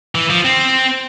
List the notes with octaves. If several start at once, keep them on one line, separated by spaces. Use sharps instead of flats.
E3
F3
C4